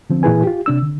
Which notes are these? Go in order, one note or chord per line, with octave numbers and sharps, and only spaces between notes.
D3 F3 C4
A#2 E3 E4 G#4 B4 G#5
F4 G4
C3 D4 E6
D3